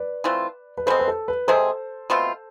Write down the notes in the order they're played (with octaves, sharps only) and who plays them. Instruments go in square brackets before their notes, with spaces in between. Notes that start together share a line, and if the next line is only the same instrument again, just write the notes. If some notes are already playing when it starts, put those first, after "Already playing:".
Already playing: [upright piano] B4 D5
[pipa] E3 A3 C4 F4
[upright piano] B4
[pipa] B2 G#3 C4 [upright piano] A4 C5
[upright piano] B4
A4
B4
[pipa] C3 G#3 C4 G#4 [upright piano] A4 C5
[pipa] B2 A3 C4 F4